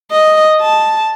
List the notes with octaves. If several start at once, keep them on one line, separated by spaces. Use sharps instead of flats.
D#5
A5